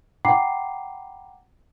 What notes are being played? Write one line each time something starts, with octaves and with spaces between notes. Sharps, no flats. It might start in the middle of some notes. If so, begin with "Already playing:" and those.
F#5 G5 A#5 B5 D6 C7